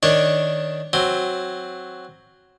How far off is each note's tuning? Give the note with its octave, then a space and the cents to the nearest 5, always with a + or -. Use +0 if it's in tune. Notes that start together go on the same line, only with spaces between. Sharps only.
D#3 +0 D4 +0 C#5 -10
F#3 +0 C4 +5